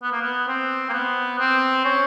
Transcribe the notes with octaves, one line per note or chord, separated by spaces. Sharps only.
B3
A#3
B3
C4
A#3
B3
C4
C#4